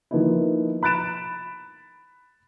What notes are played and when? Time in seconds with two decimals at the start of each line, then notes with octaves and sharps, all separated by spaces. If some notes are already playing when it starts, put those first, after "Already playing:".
0.11 D#3 F3 A#3 B3 D#4 E4
0.83 B5 F#6 A6 D7 E7